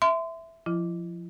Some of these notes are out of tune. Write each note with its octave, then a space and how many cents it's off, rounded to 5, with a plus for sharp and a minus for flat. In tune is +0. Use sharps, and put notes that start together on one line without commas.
E5 +0 C6 -30
F3 +0 E4 +30